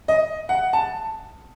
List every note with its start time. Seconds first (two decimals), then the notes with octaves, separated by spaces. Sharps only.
0.08 D#5
0.49 F#5
0.73 A5